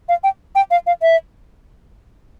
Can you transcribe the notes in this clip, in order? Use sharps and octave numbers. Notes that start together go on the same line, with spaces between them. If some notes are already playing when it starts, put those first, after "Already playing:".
F5
G5
G5
F5
F5
E5